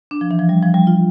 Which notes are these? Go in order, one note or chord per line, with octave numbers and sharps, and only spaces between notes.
D4
F3
E3
F3
G3
F3
G3
F4